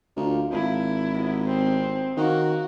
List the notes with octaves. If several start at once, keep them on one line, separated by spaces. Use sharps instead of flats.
D2 A#3 D#4 F4
G#1 E4
C3 B3 D#5
C4
D#3 A#3 C#4 F#4